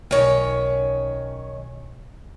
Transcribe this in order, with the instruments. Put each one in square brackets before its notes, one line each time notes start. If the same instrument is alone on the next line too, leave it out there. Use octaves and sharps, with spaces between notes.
[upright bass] B1 [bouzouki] D#3 C#4